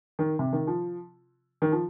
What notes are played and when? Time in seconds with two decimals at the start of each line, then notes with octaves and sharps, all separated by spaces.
0.19 D#3
0.39 C3
0.53 D#3
0.67 F3
1.62 D#3
1.72 F3